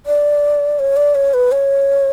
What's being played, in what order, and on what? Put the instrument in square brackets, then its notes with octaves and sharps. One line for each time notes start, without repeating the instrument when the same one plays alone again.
[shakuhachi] D5
C#5
D5
C#5
B4
C#5